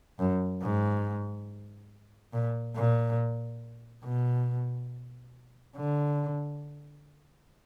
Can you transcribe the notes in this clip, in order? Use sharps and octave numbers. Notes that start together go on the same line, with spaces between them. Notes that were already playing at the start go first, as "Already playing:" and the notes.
F#2
G#2
A#2
A#2
B2
D3